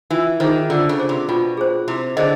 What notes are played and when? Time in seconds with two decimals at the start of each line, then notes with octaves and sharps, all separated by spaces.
0.10 E3 F4
0.40 D#3 G#4 C5
0.70 D3 F4
0.89 C#3
0.99 G#4 C5
1.09 C3
1.29 B2 F4
1.57 G#4 C5
1.88 C3 E4
2.17 D3 G#4 C5 D#5